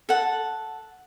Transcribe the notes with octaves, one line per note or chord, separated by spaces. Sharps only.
A4 F#5